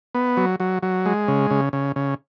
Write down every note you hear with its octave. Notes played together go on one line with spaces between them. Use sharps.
B3
F#3
F#3
F#3
G#3
C#3
C#3
C#3
C#3